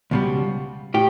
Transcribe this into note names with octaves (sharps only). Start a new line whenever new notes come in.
C#2 B2 G3
A2 G4